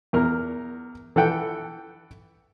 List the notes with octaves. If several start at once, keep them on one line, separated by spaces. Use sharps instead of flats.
E2 A#4 F6
E3 A4 F#5 G5